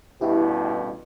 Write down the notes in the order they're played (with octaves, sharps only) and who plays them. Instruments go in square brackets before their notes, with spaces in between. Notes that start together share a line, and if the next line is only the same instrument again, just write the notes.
[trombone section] A1 G2 B2 [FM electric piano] E4 G4